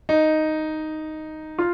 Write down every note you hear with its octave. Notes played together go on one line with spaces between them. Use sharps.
D#4
F4